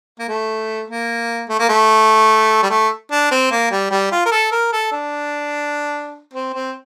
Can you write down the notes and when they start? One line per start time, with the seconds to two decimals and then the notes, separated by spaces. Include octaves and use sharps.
0.19 A#3
0.28 A3
0.88 A#3
1.49 A3
1.59 A#3
1.69 A3
2.63 G3
2.70 A3
3.11 D4
3.31 C4
3.51 A#3
3.71 G3
3.91 G3
4.11 F4
4.25 A#4
4.31 A4
4.51 A#4
4.72 A4
4.92 D4
6.33 C4
6.53 C4